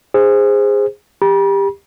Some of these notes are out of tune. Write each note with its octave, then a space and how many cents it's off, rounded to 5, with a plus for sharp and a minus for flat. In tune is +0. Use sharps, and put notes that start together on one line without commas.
G#4 -20 C5 +0
G4 +20 B5 -45